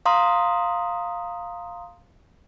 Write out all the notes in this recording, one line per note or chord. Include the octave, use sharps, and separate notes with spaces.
F5 A#5 C6 D#6